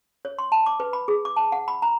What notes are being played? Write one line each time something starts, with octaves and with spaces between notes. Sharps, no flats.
C#5
C6
A5
D6
B4
B5
G#4
D6
A5
F#5
B5
A#5